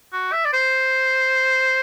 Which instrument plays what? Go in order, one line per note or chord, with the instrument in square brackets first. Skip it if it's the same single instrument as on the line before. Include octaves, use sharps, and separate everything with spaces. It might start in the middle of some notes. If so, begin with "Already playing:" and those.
[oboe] F#4
E5
D5
C5